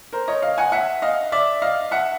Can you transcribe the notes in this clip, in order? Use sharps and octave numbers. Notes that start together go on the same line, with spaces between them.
A#4 C5
C#5 D#5
D#5 F5
F#5 G#5
E5 F#5
D#5 F5
D5 E5
D#5 F5
E5 F#5